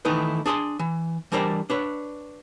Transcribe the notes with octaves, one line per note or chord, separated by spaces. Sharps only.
D#3 E3 A3 D#4 E4 B4
D4 G#4 G#5 C6
E3
E3 G3 D4 A#4 C5 D5
D4 B4 C#5